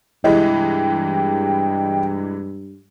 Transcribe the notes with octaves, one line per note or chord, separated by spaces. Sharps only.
G2 C3 E3 G#3 E4 D#5 G5